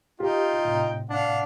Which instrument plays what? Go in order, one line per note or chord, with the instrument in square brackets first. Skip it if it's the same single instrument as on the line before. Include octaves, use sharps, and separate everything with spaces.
[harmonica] D#4 G5 [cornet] F4 [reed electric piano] G4
[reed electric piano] A2 C3
[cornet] D4 [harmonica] F5 F#5